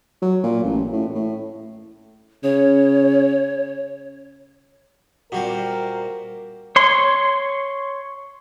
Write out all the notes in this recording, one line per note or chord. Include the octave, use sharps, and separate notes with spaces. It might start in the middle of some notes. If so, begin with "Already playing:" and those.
F#3
A#2
A1
A2
A2
C#3 C#5
A#2 G3 C4 F#4 A#4
C#5 C6